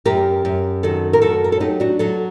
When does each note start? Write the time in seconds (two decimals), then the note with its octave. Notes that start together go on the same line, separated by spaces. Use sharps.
0.05 F#2 G4 A#4
0.45 F#2
0.83 D#3 F#4 A4
1.13 A#4
1.22 F#2 F#4 A4
1.44 A#4
1.52 A4
1.60 F#3 D#4 G4
1.80 D4 F#4
1.99 F#3 F#4 A4